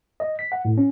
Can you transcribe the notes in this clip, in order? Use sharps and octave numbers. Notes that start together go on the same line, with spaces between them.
D#5
B6
F#5
A2
C#4